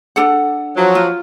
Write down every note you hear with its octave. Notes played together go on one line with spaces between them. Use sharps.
D4 A4 F#5
F3 F#3
F4